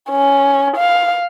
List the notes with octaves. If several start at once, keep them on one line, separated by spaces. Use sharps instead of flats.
C#4
F5